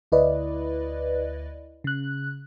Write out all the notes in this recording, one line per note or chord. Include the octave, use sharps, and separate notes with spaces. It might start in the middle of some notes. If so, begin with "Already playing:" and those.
D2 E4 B4 D5 D#5
C#3 F#6